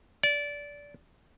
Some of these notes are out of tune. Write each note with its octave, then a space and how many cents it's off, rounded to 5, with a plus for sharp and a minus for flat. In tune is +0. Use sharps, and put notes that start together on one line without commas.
D5 -20